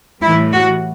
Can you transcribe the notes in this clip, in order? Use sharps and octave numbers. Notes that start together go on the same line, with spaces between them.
A2 E3 G3 E4
F#4